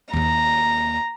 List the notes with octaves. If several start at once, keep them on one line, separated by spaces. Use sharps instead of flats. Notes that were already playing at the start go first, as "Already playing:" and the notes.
D#2 A#3 A#5